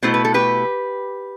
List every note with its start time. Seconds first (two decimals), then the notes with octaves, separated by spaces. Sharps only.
0.02 B2 A3 E4 C5
0.14 B4
0.25 A4
0.34 G4 B4